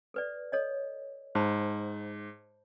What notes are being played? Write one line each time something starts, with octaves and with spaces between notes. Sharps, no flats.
A4 B4 D5
A4 C#5 D#5
G#2 C5 A5 B5